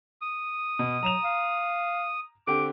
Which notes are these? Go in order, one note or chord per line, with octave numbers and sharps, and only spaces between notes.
D#6
B2
F#3 A#5 E7 F7
F5
D3 C4 G4 D6